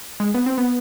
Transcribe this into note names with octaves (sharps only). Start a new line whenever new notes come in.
G#3
B3
C4
B3